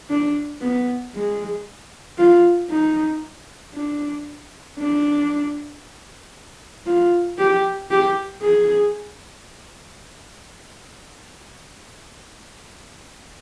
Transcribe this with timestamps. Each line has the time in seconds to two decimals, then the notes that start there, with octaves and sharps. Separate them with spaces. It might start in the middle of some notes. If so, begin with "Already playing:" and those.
0.10 D4
0.61 B3
1.15 G#3
2.18 F4
2.70 D#4
3.74 D4
4.78 D4
6.86 F4
7.39 G4
7.91 G4
8.42 G#4